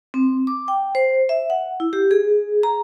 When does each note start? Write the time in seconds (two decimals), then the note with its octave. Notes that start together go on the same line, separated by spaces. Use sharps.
0.14 C4
0.47 D6
0.68 G5
0.95 C5
1.29 E5
1.50 F#5
1.80 E4
1.93 G4
2.11 G#4
2.63 A#5